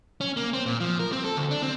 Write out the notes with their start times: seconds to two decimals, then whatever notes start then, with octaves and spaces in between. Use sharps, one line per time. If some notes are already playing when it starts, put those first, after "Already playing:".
0.21 C#4
0.37 A#3
0.53 C4
0.66 A#2
0.80 F3
0.99 A#4
1.12 C4
1.24 A4
1.37 D2
1.51 D4
1.62 C4